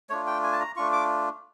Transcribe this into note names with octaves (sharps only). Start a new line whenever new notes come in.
A3 D4 F4 C#5
G5
G#5
A5
A#5
A3 D4 F4 C#6
D6